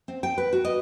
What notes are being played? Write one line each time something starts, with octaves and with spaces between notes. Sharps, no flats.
C4
G5
B4
F#4
D#5